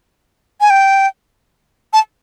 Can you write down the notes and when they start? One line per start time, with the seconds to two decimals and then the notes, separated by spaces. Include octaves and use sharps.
0.61 G#5
0.70 G5
1.93 A5